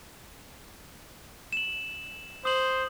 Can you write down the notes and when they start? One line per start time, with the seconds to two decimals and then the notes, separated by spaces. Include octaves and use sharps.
1.53 E7 F#7
2.45 C5 D#6 F#7